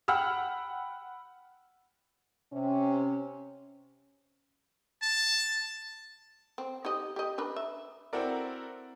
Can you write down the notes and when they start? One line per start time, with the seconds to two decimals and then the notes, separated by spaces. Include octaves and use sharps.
0.08 F#5 G5 B5 E6 F6
2.53 C3 C#4
5.02 A5
6.58 C4
6.85 D#4 G4 D#5
7.16 G4 D#5
7.38 D4 A#4 B4
7.56 E5
8.13 C4 E4 F#4 A4 A#4 D5